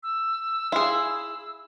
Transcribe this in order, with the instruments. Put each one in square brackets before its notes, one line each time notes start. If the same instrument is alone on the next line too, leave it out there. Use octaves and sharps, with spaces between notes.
[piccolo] E6
[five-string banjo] E4 G#4 [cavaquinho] F5 C6